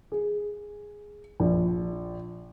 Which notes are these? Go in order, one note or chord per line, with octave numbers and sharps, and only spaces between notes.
G#4
A#1